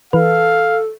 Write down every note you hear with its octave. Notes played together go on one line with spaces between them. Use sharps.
E3 A4 B4 F5